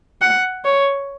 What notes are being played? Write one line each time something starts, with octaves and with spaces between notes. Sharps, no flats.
F#5
C#5